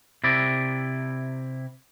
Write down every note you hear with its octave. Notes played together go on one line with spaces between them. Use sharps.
C3 E4 D5